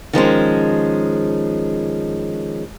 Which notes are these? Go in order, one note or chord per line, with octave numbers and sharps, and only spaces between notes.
D#3 F3 G#3 C#4